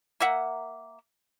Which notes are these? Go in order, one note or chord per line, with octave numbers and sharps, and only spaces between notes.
A#3 A#4 E5 F#5